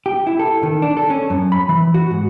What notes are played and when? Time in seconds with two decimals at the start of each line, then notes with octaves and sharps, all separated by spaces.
0.06 G4
0.27 E4
0.39 A4
0.63 D#3
0.82 D4
0.97 A4
1.10 C#4
1.30 F#2
1.52 B5
1.69 E3
1.94 F#4
2.11 G#2